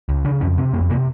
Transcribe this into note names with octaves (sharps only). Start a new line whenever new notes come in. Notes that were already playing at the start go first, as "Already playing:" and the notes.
C#2
C#3 D4
F2 C#4
C3 C4
F2 A#3
C3 A#3